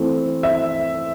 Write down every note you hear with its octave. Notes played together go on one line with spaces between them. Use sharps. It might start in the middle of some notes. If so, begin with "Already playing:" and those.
Already playing: E3 A3 C4
E5